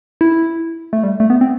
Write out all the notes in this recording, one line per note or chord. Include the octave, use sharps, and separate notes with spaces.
E4
A3
G3
A3
B3
C4